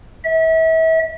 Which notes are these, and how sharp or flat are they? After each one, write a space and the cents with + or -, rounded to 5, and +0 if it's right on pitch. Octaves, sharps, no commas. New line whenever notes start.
E5 -35